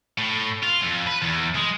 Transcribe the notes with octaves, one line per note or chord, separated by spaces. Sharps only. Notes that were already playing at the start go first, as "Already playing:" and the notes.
A2
F4
F2
B4
E2
G#3